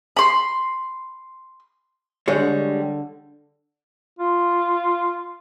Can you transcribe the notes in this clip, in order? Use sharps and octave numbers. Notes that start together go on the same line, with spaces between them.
B5 C6
D3 G3 G#3 C#5
F4